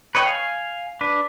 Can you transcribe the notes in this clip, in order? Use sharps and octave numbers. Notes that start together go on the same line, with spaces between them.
B4 C#5 D#5 G5
F5 G#5
D4 B4